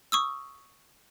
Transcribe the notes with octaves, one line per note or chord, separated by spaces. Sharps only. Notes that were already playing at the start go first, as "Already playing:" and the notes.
C#6 D#6 E6